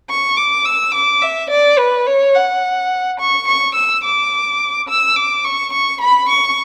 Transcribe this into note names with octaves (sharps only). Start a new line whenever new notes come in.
C#6
D6
E6
D6
E5
D5
B4
C#5
F#5
C#6
C#6
E6
D6
E6
D6
C#6
C#6
B5
C#6